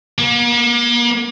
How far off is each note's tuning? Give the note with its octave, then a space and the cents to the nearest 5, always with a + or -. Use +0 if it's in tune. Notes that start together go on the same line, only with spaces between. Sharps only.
A#3 +40